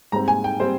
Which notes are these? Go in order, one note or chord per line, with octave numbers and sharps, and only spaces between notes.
G#2 G3 C4 A#5
G#5
G5
G3 C4 C5